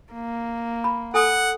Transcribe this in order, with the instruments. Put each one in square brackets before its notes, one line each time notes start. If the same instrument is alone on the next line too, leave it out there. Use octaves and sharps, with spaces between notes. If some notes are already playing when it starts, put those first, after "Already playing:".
[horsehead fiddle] A#3
[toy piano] B5
[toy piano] A4 G#5 D#6 [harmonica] F#5